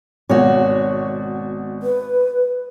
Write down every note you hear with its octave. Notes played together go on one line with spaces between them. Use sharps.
G#1 B2 F#4 C#5
B4